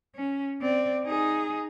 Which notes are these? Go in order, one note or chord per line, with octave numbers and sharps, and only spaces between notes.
C#4
C4 D5
D#4 G#4